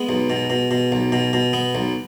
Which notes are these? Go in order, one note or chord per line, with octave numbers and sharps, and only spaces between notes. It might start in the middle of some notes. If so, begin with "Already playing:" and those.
Already playing: G#3 B3 G#4
B1
B2
B2
B2
B1
B2
B2
B3
B1